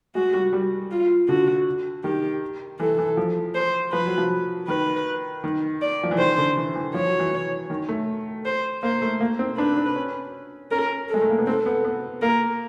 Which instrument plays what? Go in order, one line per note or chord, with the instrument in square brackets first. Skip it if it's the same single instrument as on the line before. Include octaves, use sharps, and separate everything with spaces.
[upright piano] G#3 [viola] F#4
[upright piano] G3
G3
[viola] F4
[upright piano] D3 [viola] F#4
[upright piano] D#3 [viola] G4
[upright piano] E3 [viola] A4
[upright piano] E3
F3
[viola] C5
[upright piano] F3 [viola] B4
[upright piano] F#3
F3
[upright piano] D#3 [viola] B4
[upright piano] D#3
[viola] D5
[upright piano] F3
E3
[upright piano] D#3 [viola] C5
[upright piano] D3
E3
E3
[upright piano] F3 [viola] C#5
[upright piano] F#3
E3
E3
D#3
A3
[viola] C5
[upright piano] A#3 [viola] C5
[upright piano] A3
A#3
C4
[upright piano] D4 [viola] B4
[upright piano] D4
C#4
[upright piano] C#4 [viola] A#4
[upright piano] G#3 [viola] A4
[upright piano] A3
A#3
B3
[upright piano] C4 [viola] A4
[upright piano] B3
B3
[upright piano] A#3 [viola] A#4